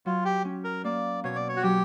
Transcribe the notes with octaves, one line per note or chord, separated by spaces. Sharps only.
F#3 F4
G4
C#4
A#4
A#3 D5
B2 C#5
D5
C#5
F#4
F#3 G4